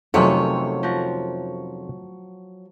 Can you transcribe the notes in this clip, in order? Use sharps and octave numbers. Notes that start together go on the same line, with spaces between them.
F2 C3 D#3 F#3 A3 C4 C#4 C#5
F3 F#4